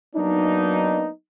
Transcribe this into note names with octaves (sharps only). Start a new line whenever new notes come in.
F#3 A#3 B3 D4 D#4